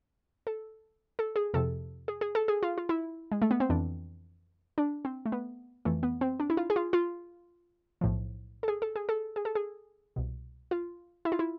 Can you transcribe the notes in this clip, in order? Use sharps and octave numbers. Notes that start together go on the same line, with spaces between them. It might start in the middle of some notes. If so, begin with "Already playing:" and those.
A4
A4
G#4
F2 C3 F3 A4
G#4
G#4
A4
G#4
F4
F4
E4
G#3
A3
B3
C4
F2 E3 D4
D4
C4
A3
B3
F2 E3 A3
B3
C4
D4
E4
F4
G#4
F4
F4
B1 A2 F3
A4
G#4
A4
G#4
A4
G#4
A4
G#4
C2 B2
F4
E4
F4
E4